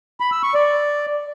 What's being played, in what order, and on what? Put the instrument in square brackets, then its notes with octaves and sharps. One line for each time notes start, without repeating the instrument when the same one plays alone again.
[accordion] B5
E6
C#6
D5